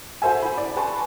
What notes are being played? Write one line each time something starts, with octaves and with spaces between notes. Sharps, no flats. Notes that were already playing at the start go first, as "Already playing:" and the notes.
F#4 A4 C5 E5 G#5
E4 B5
D5
B4 G#5 A5 C6 C#6